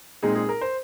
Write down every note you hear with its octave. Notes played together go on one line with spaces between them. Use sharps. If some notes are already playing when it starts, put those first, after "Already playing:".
A#2 G#3 C4 D#4 G#4
G#4
A#4
C5